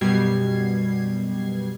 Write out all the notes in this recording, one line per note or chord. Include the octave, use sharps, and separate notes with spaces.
F#2 B2 G3 G#6 C7